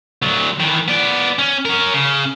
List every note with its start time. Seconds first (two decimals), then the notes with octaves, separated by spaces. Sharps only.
0.22 D2 F#3
0.60 D#3 E3
0.88 B3 D5
1.39 C#4
1.65 C#4 A#4
1.94 C#3